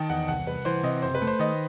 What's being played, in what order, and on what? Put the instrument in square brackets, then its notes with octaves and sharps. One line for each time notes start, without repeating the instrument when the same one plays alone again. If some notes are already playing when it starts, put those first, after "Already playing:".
Already playing: [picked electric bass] D#3 [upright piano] D#5 G5 A5
[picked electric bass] E2 [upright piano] F#5
[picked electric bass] C2 [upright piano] F#5
[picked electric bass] C2 [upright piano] B4
[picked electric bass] E3 [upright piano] C5
[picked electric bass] C3 [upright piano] D#5
[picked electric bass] F#1 [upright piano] C5
[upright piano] B4
[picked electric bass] A3
[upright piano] C5
[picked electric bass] D#3 [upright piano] D#5